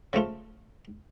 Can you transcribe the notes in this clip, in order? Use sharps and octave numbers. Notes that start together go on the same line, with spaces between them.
C#3 F3 A3 F4